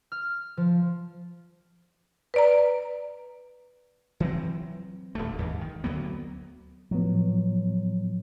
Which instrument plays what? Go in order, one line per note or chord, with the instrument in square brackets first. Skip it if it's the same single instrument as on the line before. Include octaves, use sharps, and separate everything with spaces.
[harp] F6
F3
[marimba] B4 D5 A#5
[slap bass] E3 F#3 C4
D#1 D2 A3
D#2 G#2 E3
D#3
D2 F#3 A#3 B3
[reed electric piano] A2 F3 B3 [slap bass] F#3